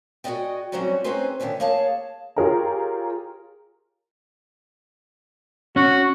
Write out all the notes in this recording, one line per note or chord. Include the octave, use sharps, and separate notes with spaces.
F#4 G#4 B4 D5 D#5 G5
F#3 G3 C4 C#4 D#4 F#4
C4 C#4 D#4 G#4 B4 C5
D#3 F#3 A3 C#4 D4
A#3 G#4 C#5 F5 A5
F4 G4 G#4 A#4 C#5 A#5
C#4 F#4